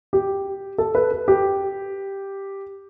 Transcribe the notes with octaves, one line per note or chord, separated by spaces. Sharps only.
G4
A4
B4
A4
G4